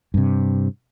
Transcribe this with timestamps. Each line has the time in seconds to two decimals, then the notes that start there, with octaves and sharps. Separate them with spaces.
0.14 G2 C3